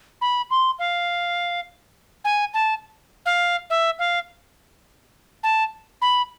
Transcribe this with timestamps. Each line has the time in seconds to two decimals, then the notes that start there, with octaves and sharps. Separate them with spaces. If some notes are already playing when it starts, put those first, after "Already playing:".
0.21 B5
0.51 C6
0.79 F5
2.25 G#5
2.54 A5
3.26 F5
3.70 E5
3.99 F5
5.43 A5
6.02 B5